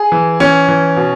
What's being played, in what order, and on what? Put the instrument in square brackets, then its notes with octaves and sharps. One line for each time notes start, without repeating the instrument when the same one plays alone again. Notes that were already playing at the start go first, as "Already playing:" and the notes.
Already playing: [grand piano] G#4
E3
E3 C#4
E3
B2